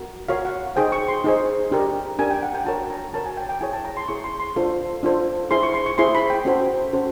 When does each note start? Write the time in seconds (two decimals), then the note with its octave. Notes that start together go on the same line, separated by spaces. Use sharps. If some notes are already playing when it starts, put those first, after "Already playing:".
Already playing: F#4 A#4
0.29 F#4 A#4 C#5 F5
0.45 F#5
0.76 D#4 G#4 C5 G5
0.92 C#6
1.08 C6
1.24 D#4 G#4 C5
1.71 D4 G4 A#4
2.19 D4 G4 A#4 G#5
2.30 G5
2.42 F#5
2.55 G5
2.66 F#4 A#4 C#5 A5
2.90 A#5
3.13 F#4 A#4 C#5 A5
3.26 G#5
3.37 G5
3.49 G5
3.61 E4 G#4 C#5 G#5
3.73 A5
3.85 A#5
3.97 C6
4.08 E4 G#4 C#5 C#6
4.24 C6
4.40 C6
4.56 D4 F4 A4 C5
5.03 D4 F4 A4 C5
5.51 E4 G#4 C5 C6
5.63 C#6
5.74 C6
5.86 C#6
5.98 E4 G#4 C5 C6
6.15 B5
6.30 G5
6.45 C#4 F#4 A4 C5
6.93 C#4 F#4 A4 C5